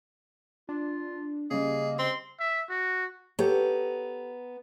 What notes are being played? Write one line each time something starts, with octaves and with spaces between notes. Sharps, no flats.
D4 F4
C#3 G3 A#3 G#4 D#5
C4 C6
E5
F#4
B3 G4 A4 C#5 A#5